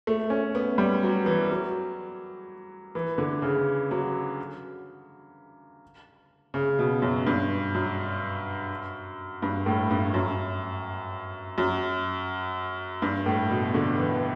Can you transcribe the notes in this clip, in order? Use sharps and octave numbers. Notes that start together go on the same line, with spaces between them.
A3
C#4
B3
G3
F#3
E3
F#3
E3
D3
C#3
F#3
C#3
B2
F#2
G2
F#2
G2
A2
G2
F#2
F#2
G2
A2
B2
D3
E3